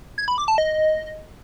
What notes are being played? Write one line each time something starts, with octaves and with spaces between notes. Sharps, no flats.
G#6
B5
D6
A5
D#5